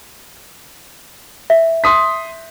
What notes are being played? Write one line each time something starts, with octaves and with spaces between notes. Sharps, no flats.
E5
C6 D#6 B6